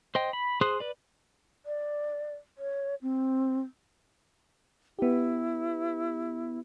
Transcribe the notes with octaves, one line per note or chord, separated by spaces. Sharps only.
C5 D#5 G5
B5
G#4 C5 C6 D#6 F#6
B4 D5
D5
C#5
C4
B3 E4 G4